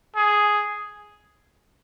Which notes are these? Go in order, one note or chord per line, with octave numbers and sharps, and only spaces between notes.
G#4